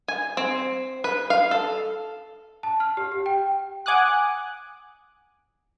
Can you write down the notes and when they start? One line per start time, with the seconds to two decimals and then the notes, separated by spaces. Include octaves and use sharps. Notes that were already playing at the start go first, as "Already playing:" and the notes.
0.08 G#5
0.37 C4
1.04 B4
1.30 F5
1.51 A4
2.63 A5
2.80 F6
2.97 G4
3.12 G4
3.26 G5
3.86 F#5 G#5 D6 D#6 F#6